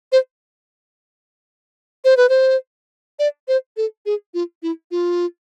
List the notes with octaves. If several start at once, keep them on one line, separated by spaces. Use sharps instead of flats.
C5
C5
B4
C5
D5
C5
A4
G#4
F4
E4
F4